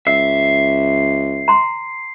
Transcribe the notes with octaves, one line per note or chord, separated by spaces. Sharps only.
C#2 E5 E6 C7
A#5 C6